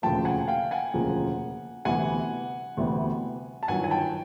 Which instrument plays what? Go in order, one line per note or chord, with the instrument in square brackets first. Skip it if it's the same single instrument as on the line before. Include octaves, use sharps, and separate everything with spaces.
[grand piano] E1 D2 C#3 F3 A#3 G5 A5
F#5 G#5
F5 G5
F#5 G#5
E1 D2 C#3 F3 A#3
D2 C3 E3 G3 B3 F#5 G#5
D2 C3 E3 G3 B3
A5
G1 G2 D#3 F#3 F#5 G#5
G#5
G5 A5